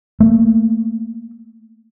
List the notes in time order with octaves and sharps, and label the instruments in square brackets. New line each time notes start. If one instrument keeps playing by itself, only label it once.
[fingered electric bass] A3 A#3